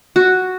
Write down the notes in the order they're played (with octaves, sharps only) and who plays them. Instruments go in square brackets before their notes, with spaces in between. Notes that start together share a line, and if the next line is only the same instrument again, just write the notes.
[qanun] F#4